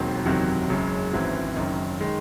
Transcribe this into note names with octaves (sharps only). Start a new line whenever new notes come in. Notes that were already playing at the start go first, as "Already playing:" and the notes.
Already playing: E1 D#2 D#3 F#3 C4
F#1 E2 C3 D#3 F#3
F#1 F#2 C#3 G#3
G#1 F#2 E3 C4 F#4
F#1 F#2 D#3
D#3 G#3